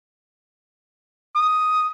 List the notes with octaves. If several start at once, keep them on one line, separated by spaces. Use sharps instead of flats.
D#6